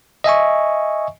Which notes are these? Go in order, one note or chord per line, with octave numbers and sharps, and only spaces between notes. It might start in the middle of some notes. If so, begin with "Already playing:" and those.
D#5 E5 G#5 C#6